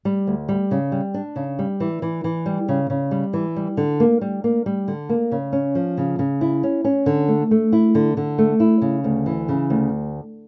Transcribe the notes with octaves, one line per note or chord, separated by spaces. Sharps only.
G3
D2
G3
C#3
G3
D4
C#3
G3
E3
E3
E3
G3
C#3
C#3
G3
E3
G3
D3
A#3
G3
A#3
G3
D3
A#3
C#3
C#4
F3
C#3
C#3
E4
C#4
C#4
D3
A3
A3
E4
D3
D3
A3
E4
C#3
D2
E3
C#3
D2